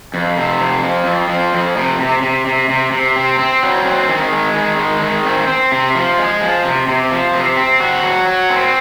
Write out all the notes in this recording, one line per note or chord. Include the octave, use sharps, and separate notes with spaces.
F2
C3
F2
F3
F2
F3
F2
C3
C3
C3
C3
C3
C3
C4
C4
F#3
C4
D#3
G#3
D#3
G#3
D#3
C4
C4
C3
F3
G#3
F3
C3
C3
F3
C3
C4
F#4
F#3
F#4
C4